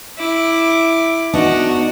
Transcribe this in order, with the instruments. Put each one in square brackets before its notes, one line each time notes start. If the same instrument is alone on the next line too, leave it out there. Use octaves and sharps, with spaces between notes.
[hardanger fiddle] E4 D6
[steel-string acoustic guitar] B3 D4 D#4 [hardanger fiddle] F#4